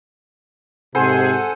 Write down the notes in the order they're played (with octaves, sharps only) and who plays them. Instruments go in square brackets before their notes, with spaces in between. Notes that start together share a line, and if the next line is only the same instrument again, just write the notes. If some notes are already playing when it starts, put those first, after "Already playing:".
[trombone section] G#2 C3 [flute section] G#4 [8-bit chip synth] A4 F#5 G#5 [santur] C5